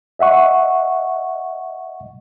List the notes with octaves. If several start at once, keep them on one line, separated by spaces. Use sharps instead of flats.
D#5 E5 F#5 C#6